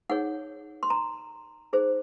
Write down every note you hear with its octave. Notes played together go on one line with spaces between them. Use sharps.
D#4 G#4 C#5 F#5
C6
A#5
D#4 G#4 C5